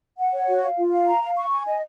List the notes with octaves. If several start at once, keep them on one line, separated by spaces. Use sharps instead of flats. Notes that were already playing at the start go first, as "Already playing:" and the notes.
F#5
C#5
F#4
F5
F4
F5
A#5
F5
C#6
G#5
D#5